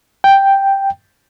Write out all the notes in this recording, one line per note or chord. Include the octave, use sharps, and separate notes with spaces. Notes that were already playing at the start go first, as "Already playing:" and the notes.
G5